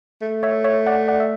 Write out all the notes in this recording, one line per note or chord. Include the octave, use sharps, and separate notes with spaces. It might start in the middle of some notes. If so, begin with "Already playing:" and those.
A3
C#5 E5
C#5 E5
D5 F#5
D5 F#5
E5